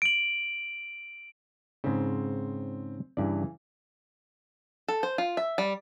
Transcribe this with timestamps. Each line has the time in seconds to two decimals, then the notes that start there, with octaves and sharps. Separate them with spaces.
0.02 D7 F#7
1.84 G#2 C#3 C4
3.17 G2 C#3 E3 D5
4.88 A4
5.03 C5
5.18 F4
5.37 E5
5.58 G3